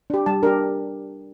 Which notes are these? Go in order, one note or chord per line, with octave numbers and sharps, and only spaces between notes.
D4 G4
G3 A5
D4 G4 A#4